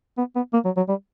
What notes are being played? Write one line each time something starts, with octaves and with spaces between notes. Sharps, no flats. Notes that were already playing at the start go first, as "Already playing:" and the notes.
B3
B3
A#3
F#3
F#3
G3